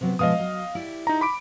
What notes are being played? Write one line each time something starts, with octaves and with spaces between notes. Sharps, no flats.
C3 F#3 B3
B2 F3 G#3 D#5 F5 D#6
F#3
E4 G4 D5
D#4 A#5
B5 D6 D7